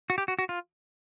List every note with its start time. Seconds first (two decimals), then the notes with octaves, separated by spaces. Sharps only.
0.10 F#4
0.18 G4
0.28 F#4
0.39 F#4
0.49 F4